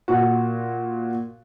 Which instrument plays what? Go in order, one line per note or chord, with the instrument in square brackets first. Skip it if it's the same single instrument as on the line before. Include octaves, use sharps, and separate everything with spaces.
[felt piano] A#2 F#4